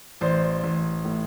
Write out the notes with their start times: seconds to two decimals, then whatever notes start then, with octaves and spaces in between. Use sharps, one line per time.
0.21 A1 C5 D5
0.64 A1
1.05 A2